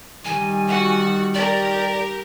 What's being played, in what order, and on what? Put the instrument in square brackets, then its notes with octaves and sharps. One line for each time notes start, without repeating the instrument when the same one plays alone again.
[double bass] D#3 G3 [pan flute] G#5
[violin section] F#4 F#5
[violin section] G4 A#4 [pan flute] D5